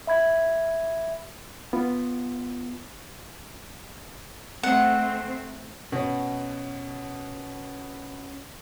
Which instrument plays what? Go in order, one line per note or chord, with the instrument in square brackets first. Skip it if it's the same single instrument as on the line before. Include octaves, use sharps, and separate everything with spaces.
[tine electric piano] E5 B5 G#6
[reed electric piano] B3 F4
[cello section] A3 C4 [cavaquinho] F#5
[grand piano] B2 [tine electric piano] C#4 C#5